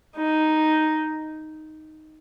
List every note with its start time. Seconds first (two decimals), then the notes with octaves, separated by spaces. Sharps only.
0.16 D#4